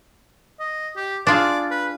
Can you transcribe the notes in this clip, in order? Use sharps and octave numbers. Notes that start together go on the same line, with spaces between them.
D#5
G4
D4 F4 G#4 D5
B4